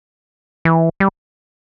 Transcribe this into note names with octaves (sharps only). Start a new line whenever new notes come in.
E3
G3